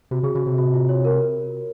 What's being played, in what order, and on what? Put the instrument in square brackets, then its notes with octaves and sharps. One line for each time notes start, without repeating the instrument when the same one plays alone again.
[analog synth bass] C3 [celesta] F#4
[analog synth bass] C#3 [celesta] G#4
[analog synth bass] C#3 [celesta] F#4
[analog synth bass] C3
[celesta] F#4
F4
C#5
A#4